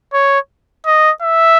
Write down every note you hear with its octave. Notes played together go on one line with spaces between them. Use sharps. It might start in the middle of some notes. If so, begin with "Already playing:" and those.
C#5
D#5
E5